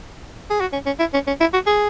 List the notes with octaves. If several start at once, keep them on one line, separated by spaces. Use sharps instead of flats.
G#4
F#4
C#4
C#4
E4
C#4
C#4
E4
F#4
G#4